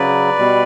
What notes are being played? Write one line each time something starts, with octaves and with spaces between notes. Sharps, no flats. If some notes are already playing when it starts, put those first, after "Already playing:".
Already playing: C#3 F#3 B4 D5
B2 G3